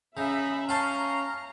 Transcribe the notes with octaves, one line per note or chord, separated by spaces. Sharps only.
C#3 D#4 E5 B5
C#4 F5 G5 A5 A#5